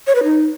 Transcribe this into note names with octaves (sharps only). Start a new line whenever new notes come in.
C#5
B4
D#4